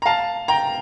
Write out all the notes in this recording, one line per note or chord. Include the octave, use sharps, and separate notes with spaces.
A#5
F5 A5
G5 A#5